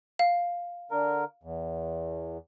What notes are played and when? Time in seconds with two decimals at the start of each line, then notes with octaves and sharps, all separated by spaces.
0.19 F5
0.91 D3 A#4
1.43 E2